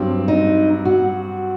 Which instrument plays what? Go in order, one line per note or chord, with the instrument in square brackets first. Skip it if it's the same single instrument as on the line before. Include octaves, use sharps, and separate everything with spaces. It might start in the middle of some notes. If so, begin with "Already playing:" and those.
Already playing: [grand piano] G2 F#3 C4
[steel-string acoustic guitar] D#4
F#4